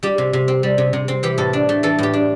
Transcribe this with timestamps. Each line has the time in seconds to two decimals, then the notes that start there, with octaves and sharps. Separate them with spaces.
0.03 G3 G4
0.18 C3
0.33 C3
0.48 C4
0.63 G3
0.78 C3
0.93 C3
1.08 C4
1.23 E3 G4
1.38 A2 A4
1.53 D4
1.69 A3
1.83 E3 A4
1.99 A2 G4
2.13 D4